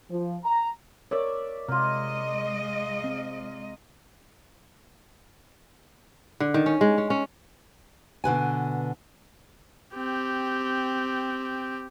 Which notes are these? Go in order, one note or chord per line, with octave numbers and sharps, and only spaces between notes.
F3
A#5
A#4 C#5 D5 E5
C3 G#3 A#3 F4 D#5
C4
D3
D#3
C#4
G#3
C#4
C#4
B2 D3 B4 G#5
C4 G4